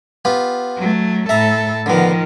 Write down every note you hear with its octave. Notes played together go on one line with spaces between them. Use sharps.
B3 F4 G4
F#3 A3
A2 A4 E5 A#5
D3 D#3 F3 B3